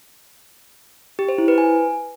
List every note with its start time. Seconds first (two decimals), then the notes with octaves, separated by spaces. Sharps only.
1.19 G4
1.29 C5
1.38 E4
1.48 B4
1.58 G#5